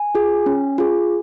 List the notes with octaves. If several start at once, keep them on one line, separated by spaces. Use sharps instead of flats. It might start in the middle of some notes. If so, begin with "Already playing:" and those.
Already playing: G#5
F4 G#4
C#4
F4 G#4